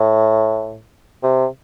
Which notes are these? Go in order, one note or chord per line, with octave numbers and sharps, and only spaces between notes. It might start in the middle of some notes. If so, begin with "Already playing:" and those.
Already playing: A2
C3